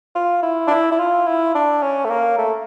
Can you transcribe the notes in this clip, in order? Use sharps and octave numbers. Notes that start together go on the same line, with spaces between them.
F4
E4
D4
E4
E4
F4
E4
D4
C#4
A3
A#3
A3